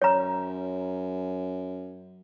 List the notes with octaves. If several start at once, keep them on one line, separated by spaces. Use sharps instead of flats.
F#2 C#5 A#5